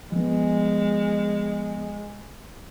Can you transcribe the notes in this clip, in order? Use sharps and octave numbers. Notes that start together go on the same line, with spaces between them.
F3 G#3 B3